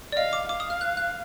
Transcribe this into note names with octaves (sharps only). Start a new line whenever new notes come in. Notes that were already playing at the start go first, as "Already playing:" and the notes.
D5
D#5 F5
D6
F5 D6
D#6
F6
F#6
F#6